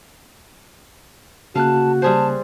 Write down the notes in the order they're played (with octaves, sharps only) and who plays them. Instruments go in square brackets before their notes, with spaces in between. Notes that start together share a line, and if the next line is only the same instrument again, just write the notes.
[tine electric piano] C#3 A#3 F#6 [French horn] F#4 [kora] F5 [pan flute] A5
[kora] G3 G#4 C5 [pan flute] A5